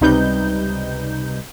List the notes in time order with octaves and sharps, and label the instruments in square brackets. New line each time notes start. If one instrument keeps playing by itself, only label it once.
[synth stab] C#2 C3 G3 D#4 B4 G6